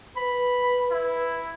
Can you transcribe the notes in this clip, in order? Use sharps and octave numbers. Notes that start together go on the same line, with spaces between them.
B4 B5
E4